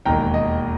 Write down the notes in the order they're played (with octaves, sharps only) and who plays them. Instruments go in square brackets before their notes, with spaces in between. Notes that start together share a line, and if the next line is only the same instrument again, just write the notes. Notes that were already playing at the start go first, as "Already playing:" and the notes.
[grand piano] E1 D#2 D#3 G5 A#5
D#5